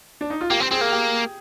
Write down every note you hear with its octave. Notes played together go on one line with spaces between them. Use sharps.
D4
D#4
F4
A#3 G4
C4
C4 G#4
A#3
G4